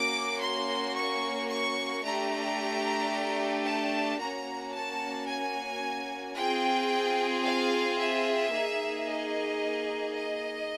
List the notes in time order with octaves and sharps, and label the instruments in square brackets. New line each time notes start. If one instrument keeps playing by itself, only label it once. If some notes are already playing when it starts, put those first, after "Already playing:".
Already playing: [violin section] A#3 C#4 F#4 D6
C6
C#6
C#6
A3 D4 G4 A#5
A5
A#3 C#4 F#4 A#5
A5
G#5
C4 F4 G#4 G5
F5
E5
A#3 D#4 G#4
D#5
D#5